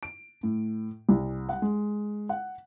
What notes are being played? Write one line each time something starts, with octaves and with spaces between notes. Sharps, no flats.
D7
A2
C2
F#5
G#3
F#5